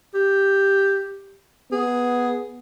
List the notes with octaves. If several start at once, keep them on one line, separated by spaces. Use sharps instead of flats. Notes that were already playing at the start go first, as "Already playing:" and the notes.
G4
B3 G#4